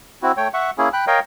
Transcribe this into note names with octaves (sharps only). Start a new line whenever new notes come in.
C4 E4 F#4
A3 C#5 G5
E5 F#5 C#6
A#3 C#4 E4 G#4
G5 B5 F#6
A#4 C#5 D#5 F5 G5